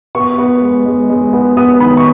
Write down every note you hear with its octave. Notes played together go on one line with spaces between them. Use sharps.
B3 C#6
B3
G#3
G#3
G#3
B3
B3 D#6
D#3 B5
C#6